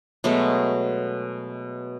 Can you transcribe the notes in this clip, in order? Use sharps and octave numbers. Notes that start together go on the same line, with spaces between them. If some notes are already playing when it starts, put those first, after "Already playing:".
B2 F#3 G#3 A3